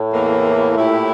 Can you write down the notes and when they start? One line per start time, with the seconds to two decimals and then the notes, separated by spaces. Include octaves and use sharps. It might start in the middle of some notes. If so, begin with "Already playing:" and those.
Already playing: A2
0.10 E2 E3 A#3
0.74 A#2 A3 E4 G4